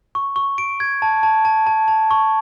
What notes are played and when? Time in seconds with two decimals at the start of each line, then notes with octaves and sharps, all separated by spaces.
0.15 C#6
0.36 C#6
0.58 D7
0.80 G#6
1.02 A5
1.23 A5
1.45 A5
1.67 A5
1.88 A5
2.11 C#6